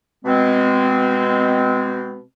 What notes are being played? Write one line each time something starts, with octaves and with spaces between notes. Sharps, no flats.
B2 G#3 C4